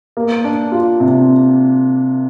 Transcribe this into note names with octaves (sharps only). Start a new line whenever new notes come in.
A#3
D4
F4
C3